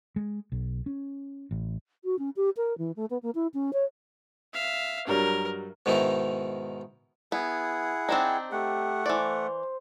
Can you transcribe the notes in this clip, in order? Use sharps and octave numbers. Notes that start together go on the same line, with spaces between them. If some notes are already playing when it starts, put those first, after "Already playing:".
G#3
B1
C#4
A1
F#4
C#4
G4
A#4
E3
A3
B3
A#3
E4
C#4
C#5
E5 F5
G2 F#3 G3 A#4
G#2 B2 D#3 D#4 E4
B3 E4 G#4 F#5
C4 D4 D#4 G5
A3 G4 F#5
E3 C5 D5